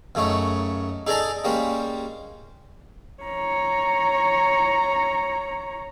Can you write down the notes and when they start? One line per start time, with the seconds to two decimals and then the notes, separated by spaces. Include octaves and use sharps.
0.15 F#2 C#3 A3 D#4 C#5
1.07 D#4 G#4 A4 D5 G#5 A#5
1.44 G3 G#3 A#3 C#4 G4
3.23 C#5 A#5